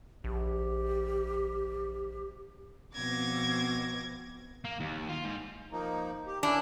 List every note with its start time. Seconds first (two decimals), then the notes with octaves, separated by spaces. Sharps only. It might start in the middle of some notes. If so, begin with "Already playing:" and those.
0.24 A#1 G4
2.95 B2 F3 C4 D6 G#6 A#6
4.65 A#3
4.80 D#2
5.09 F4
5.24 G#2
5.72 F3 A#3 D#4
6.27 G4
6.43 A#2 C#4 D4 E4